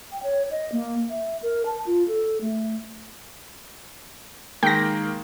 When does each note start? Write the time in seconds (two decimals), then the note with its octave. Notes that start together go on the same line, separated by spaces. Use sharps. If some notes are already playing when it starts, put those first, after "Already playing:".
0.12 G5
0.23 C#5
0.51 D#5
0.72 A#3
1.10 E5
1.42 A#4
1.66 A5
1.86 F4
2.08 A4
2.41 A3
4.63 D#3 G#3 A#3 G5 A#6